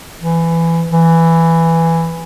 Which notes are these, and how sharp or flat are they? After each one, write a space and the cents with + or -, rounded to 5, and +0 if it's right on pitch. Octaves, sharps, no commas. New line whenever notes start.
E3 +15
E3 +5